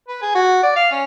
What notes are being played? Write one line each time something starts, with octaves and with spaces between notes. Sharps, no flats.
B4
G#4
F#4
D5
F5
C#4